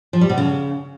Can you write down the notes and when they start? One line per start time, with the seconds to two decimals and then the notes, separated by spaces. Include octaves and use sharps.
0.13 F3
0.21 G3
0.29 B2
0.38 C#3